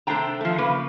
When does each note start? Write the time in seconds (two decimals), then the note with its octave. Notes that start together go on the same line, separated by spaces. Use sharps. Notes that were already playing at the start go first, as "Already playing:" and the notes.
0.07 C3 A3 D4 C5 G5 A#5
0.41 F3 A3
0.58 C#3 A#3 B4